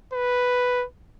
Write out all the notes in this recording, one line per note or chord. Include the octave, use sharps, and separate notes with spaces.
B4